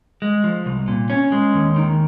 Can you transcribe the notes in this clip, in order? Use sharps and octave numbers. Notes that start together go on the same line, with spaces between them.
G#3
F3
C2
A#2
C#4
G#3
D#2
D#3